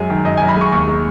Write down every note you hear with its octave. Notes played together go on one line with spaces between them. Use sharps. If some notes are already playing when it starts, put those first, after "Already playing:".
Already playing: F#2 F#3 G#3 G#5
D#3
F#2 D#5
F#2 G#5
B5
G#3 C#6
D#2 C#6
G#3